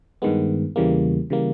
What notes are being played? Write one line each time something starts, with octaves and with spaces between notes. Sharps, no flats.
G2 D#3 G#3 B3
E2 C#3 E3 G3 A#3
C#3 E3 G3 A#3